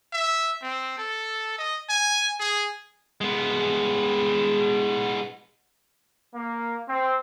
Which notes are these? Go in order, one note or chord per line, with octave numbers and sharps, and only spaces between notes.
E5
C4
A4
D#5
G#5
G#4
G#3 B3
A#3
C4